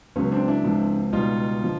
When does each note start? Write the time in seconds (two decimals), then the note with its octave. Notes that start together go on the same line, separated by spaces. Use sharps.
0.16 C#2 C#3 F#3 B3 C#4
0.32 C4 D4
0.48 D4 E4
0.64 C#2 C3 F3
1.13 C#2 B2 G3 D#4 F4
1.63 D3 F3